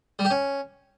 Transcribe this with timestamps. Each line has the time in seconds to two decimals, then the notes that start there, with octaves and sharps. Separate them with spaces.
0.19 G3
0.25 G4
0.31 C#4